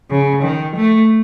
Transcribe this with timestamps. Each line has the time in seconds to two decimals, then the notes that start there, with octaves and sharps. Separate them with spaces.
0.10 C#3
0.43 D#3
0.76 A3